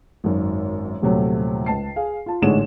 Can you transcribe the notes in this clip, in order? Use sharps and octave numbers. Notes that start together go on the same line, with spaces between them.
G#1 F#2
D#1 C3 F#3 A3
C#2 A5 C7
G#4 F5
F4 A5
A1 G#2 D3 G#3 C#5 E7